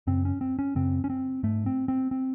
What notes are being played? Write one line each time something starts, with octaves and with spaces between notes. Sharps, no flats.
F#2 C#3 C4
C#4
C4
C#4
F#2 C#3 C4
C#4
C4
G#2 A3
C4
C4
C4